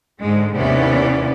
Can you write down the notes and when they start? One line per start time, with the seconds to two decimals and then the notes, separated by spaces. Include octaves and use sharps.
0.19 G#2 D3 G#3
0.55 D#2 C3 E3 B3 C#4 D5